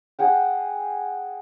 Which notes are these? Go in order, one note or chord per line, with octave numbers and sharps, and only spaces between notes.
G#4 F#5 G5